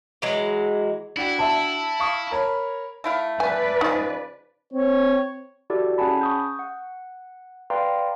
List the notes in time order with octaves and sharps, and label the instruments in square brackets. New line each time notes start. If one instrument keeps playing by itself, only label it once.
[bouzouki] E3 F#3 G#3
[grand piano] D4 F#4 G5 [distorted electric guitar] E4
[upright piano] E5 A5
[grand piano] F5 C#6 D#6
A#4 C#5 B5
[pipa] A3 E4 F5
[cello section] B4 D5 [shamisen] G#5
[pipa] C#3 F3 [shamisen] D#4
[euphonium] C4 [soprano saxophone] C#5
[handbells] E4 F#4 G4 A4 D5
C#4 G#4 F#5 G#5 A5 B5
C#6 D#6 G6
F#5
B4 D5 F5 G5 A#5 C6